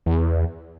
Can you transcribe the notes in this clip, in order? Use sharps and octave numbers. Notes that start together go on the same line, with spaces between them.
E2